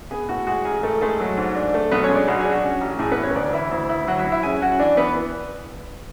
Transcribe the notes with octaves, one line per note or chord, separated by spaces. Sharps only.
B3 G#4
A2 F#4
G#3 F#4
A1 G#4
A1 A3 A4
G#3 A3 A4
F#3
G#2
D4
A3
B1 B3 B4
C#4 C#5
G#3
D4 D5
B1 F#4
G#4
D4
F#4
C#4
A1
A2 G#4
B3 B4
A1
C#4 C#5
D2 D4 D5
E3 E4 E5
D2 E4 E5
D2 E4 E5
F#3 F#4 F#5
E4 E5
F#3
E4 E5
C#4 G#4 G#5
C#4 F#4 F#5
E3 D4 D5
E3 B3 B4